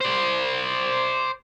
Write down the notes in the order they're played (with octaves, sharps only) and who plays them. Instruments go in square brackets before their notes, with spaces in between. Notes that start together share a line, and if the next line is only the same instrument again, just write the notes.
[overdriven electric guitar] C5 D5